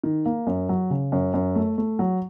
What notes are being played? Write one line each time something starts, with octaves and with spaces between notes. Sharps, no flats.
D#3
A#3
F#2
F#3
C#3
F#2
F#2
A3
A3
F#3